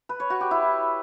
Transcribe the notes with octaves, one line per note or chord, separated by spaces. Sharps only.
B4
C#5
F#4
G4
E4